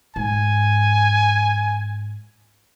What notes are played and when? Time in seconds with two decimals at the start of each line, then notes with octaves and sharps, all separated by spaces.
0.16 G#2 G#5